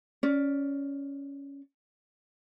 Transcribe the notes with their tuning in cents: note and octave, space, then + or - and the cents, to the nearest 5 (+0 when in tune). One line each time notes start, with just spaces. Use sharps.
C#4 +10 D5 +0